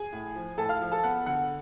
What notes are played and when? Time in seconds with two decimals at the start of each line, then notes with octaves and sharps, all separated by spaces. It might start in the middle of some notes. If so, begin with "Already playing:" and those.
Already playing: G#4 G#5
0.12 A2
0.35 F3
0.57 A2 A4 A5
0.69 F5 F6
0.81 F3
0.92 A4 A5
1.04 B3 F#5
1.26 D3 F#5